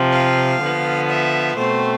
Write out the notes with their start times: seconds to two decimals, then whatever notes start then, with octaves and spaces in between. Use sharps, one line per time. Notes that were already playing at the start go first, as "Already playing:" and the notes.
Already playing: C3 F3 C4
0.12 F5
0.60 D3 F3 B3
1.09 E5
1.56 B2 A3 C4 C5